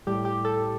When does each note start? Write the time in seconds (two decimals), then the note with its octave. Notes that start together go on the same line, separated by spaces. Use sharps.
0.07 A2 G3 G4
0.25 G4
0.45 A4